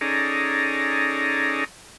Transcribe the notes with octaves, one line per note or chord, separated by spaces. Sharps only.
C#4 D#4 G#4 A4 D5 A#5